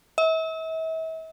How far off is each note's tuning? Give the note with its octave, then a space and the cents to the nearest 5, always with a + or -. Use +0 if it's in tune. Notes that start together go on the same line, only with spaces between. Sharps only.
E5 -40